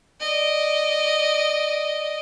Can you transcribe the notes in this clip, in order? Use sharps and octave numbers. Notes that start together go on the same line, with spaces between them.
D5 D#5